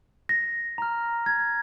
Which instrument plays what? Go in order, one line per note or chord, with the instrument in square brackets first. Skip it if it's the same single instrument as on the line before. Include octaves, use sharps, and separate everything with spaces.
[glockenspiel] A#6
A#5 F6
G#6